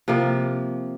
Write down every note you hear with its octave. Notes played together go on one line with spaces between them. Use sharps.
C3 F3 A#3